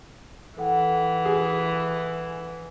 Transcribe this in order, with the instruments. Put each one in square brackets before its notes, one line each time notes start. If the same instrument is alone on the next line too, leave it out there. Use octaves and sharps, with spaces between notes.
[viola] E3 [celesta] A4 F#5 G5
[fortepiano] G#4